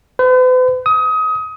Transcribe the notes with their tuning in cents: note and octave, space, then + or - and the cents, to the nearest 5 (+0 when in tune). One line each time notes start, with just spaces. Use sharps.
B4 +45
D#6 +25